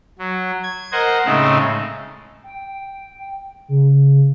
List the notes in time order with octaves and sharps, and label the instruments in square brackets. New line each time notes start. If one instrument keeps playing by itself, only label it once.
[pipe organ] F#3
G#6
A#4 C5 D#5 F#5
A2 C#3 G#3 A3 C4 D#4
[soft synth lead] G5
C#3